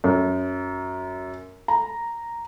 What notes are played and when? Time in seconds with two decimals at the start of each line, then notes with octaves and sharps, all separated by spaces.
0.04 F#2
1.68 A#5